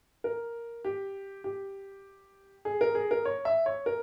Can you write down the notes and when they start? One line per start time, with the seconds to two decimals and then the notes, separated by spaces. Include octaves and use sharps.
0.24 A#4
0.85 G4
1.44 G4
2.65 G#4
2.81 A#4
2.95 G#4
3.11 A#4
3.25 C#5
3.45 E5
3.66 C#5
3.86 A#4